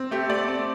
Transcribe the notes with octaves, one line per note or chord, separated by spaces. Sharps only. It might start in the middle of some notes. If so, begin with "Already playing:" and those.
Already playing: C4
A3 G4
A3 D5
C4